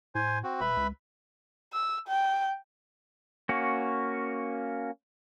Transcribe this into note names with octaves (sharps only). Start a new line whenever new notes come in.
A2 C5 G#5
C4 F#4
E1 B4 E5 B5
C#2
E6
G5
A#3 C#4 F#4